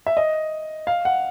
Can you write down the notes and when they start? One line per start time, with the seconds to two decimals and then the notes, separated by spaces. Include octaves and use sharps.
0.07 E5
0.17 D#5
0.87 F5
1.05 F#5